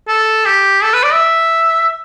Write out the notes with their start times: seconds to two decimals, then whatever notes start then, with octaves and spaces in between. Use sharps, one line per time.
0.08 A4
0.46 G4
0.83 A4
0.93 B4
1.03 D5
1.13 E5